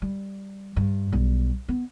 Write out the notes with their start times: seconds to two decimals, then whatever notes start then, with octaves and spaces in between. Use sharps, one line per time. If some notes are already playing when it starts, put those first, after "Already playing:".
0.02 G3
0.76 G2
1.12 B1 G3
1.68 B3